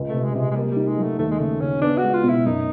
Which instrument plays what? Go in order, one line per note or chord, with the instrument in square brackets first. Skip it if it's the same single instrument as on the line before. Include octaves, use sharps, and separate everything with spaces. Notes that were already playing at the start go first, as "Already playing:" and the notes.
Already playing: [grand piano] C#2
[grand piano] C3 [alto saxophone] A3
[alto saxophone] G#3
[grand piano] C3 [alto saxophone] G3
[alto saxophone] G#3
G#3
[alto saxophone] G3 [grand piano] A#3
[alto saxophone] G3
[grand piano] D#4
[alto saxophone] G#3
[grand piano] F#3 [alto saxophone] A3
[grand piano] D#2 [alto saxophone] A3
[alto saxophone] G#3
[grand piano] C#3 [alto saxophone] A3
[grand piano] C#3 [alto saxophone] C#4
[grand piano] B3 [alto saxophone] D4
[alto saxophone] F#4
[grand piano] G#3
[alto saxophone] F4
[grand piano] B2
[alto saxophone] E4
[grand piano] F#2 [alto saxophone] D#4